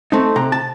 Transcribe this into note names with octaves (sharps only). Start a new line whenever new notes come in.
A3 C4 D#4
C3 A#5
A5